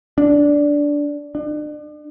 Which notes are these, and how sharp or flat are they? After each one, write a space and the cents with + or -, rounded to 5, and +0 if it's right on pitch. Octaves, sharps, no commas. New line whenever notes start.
D4 -10
D4 +35